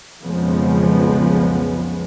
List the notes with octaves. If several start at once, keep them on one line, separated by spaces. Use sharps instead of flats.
B1 F2 C#3 F3 G#3 B3